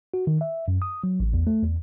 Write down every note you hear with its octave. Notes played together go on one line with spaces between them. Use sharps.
F#4
D#3
E5
F#2
D#6
F#3
A1
E2
A3
E2